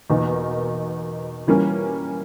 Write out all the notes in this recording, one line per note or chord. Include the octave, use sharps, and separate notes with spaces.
E2 B2 A#3 D#4 A#4
E3 G3 A#3 C#4